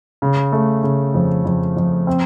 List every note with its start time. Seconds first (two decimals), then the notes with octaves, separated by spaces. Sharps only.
0.22 C#3
0.52 A3
0.83 C#3
1.14 F2
1.45 F2
1.77 F2
2.07 C4